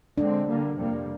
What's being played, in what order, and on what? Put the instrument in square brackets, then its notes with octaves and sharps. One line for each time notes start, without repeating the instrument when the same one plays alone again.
[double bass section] D3 G#3 C4 [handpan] D4
[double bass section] D3 G3 A#3
F2 C3 G3 A#3